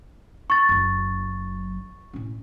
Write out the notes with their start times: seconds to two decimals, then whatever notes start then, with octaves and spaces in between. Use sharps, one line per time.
0.50 C#6 A6
0.69 F#1 F#3
2.13 A2 C#4